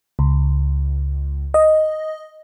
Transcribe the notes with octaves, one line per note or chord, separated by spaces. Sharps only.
C#2
D#5